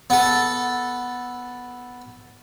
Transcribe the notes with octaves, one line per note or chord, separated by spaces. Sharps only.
B3 A4